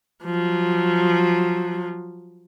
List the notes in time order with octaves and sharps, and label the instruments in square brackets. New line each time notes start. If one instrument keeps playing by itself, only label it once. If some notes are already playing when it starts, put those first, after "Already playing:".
[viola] F3 F#3